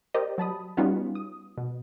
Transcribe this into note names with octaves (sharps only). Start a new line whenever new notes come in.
G4 A#4 C5 D5 D#5
F#3 A5 B5 D#6
G3 B3 C#4 D#4 F4 F#4
D#6
B2